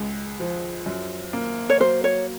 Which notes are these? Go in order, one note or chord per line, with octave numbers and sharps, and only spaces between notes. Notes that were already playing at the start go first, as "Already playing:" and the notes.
Already playing: C#2 G#3
F3
F#2
A#3
C#5
F#3 C5
C#5